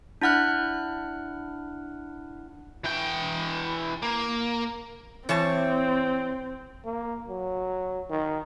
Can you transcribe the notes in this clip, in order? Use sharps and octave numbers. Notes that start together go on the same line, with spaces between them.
D4 E4 F#5 F6 F#6
E3 G5
A#3
E3 C4 C#5 A5
A#3
F#3
D#3